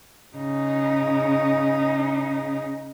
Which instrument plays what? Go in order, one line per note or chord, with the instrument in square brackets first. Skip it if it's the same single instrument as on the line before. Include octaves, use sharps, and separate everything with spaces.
[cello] C#3 D#4